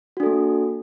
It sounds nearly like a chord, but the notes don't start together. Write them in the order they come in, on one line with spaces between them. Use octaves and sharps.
F#4 D4 A4 A#3